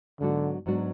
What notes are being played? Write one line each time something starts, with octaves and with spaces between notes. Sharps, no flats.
G#2 D3 F#3 B3 D4 F#4
G#2 F#3 B3 D4 F#4